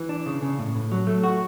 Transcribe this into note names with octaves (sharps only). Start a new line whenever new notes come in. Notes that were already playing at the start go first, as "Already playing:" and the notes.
Already playing: E3
D4
C#3
C#3
A2
A2
F#3
A3
F#4